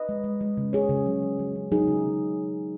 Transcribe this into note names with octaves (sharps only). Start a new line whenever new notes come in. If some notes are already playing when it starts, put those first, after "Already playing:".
Already playing: B4 D#5
G#3
G#3
G#3
C#3
C#3 G#4 C#5
C#3
F#3
F#3
F#3
C#3
F#3 D#4 G#4
C#3
C#3